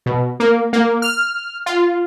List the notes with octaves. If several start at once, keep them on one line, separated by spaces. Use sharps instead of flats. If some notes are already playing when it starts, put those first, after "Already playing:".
B2
A#3
A#3
F6
F4